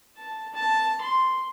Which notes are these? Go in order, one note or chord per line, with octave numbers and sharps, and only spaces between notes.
A5
A5
C6